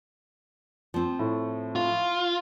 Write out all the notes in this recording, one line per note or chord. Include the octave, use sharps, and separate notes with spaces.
F3 C4
A2
F4